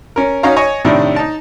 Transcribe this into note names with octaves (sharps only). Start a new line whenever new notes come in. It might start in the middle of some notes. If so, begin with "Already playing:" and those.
C#4 A#4
C#4 D#4 F#4 C#5 F5 A#5
C#5 D#5 G#5 C#6
A2 C3 D#3 D4 E4
D#4 A5